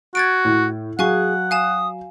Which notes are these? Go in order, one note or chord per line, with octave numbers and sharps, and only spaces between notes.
F#4 G#6 A6 D7
A2
F#3 G#4 F5 F#5 G#5 C#6
F5 G#5 D#6 E7